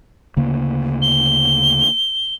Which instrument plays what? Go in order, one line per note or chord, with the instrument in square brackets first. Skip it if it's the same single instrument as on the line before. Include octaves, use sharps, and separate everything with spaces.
[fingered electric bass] D2 C#3 A#3
[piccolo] G7